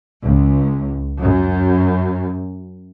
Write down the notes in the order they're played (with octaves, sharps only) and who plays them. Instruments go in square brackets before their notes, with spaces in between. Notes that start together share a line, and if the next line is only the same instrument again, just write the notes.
[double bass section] C#2
F#2